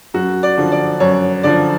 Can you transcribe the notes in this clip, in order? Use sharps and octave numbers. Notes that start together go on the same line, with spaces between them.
F#2 F#4
D5
D3 F3
D5
F#2 C#5
D3 F3 D5